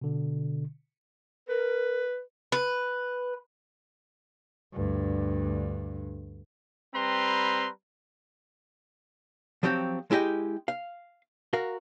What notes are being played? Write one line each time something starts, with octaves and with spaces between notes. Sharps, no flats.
B2 D3
A#4 B4
B4
D2 G2
G3 C4 B4 A#5 C6
F3 F#3 C4 G4
G#3 E4 G4 D#5 G5
F5
F#4 A#4 F5